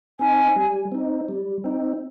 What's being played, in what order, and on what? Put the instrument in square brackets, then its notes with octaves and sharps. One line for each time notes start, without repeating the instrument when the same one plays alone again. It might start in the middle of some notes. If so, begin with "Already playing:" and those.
[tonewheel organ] C4 D#4 [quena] G#5
[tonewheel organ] G3
C4 D#4
G3
C4 D#4